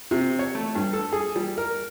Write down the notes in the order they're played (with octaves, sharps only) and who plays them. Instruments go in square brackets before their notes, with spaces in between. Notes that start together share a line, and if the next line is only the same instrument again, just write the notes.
[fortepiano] C3
C#5
A3
G2
A4
G#4
G3
A#4